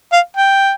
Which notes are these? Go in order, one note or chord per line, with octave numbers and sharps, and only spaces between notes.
F5
G5